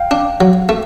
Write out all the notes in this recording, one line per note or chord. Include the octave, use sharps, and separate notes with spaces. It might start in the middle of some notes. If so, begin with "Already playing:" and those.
Already playing: F5 G5
D4
F#3
A3